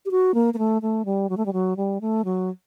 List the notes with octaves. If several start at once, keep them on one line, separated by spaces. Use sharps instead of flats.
G4
F#4
A#3
A#3
A3
A3
G3
F#3
A3
G3
F#3
G3
A3
F#3